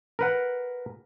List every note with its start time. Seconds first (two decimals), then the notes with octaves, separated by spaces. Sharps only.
0.19 A#4 B4 F#5